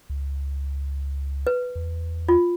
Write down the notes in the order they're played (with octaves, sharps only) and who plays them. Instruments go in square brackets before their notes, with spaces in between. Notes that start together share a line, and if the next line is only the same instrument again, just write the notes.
[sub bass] C#2
[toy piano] B4
[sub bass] E2
[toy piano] F4